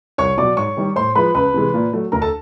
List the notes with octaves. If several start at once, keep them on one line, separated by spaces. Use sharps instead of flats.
C2 C#5 C#6
B2 F#3 D5 D6
G#2 C#5 C#6
D#3 G3
A2 C5 C6
F3 G#3 B4 B5
C#2 B4 B5
C3 E3 G#3
A#2
F#3 A3
D2 A#4 A#5
A4 A5